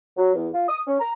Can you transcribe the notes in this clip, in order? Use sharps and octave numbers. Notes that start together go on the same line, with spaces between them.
F#3
E2
F4
D#6
C#4
A#5